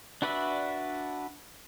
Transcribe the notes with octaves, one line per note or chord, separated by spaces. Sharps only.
D4 F#4 B4 D5 E5